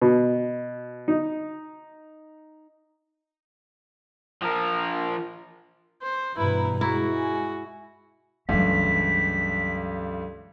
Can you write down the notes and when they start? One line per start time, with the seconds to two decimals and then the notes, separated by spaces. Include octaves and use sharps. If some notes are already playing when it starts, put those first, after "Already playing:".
0.02 B2
1.08 D#4
4.42 F3 A#4
6.02 C5
6.37 G2 B2 E3 E4 B4 A#5
6.81 G#3 E4 F#4
7.14 G#5
8.49 C#2 G2 E3 F#3 A3 B6